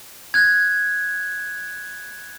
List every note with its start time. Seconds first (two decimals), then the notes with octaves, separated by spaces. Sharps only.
0.34 F#6 G#6